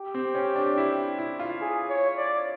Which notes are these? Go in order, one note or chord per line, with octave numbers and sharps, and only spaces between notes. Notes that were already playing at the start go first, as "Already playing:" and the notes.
Already playing: G4
C4
C#4
D4
E4
E4
F4
G#4
C#5
D5